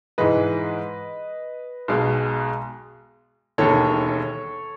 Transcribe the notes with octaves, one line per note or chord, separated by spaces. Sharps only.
G#2 E3 G#3 B4 D#5
B1 B2 G#3
E1 D#2 D#3 A4 C#5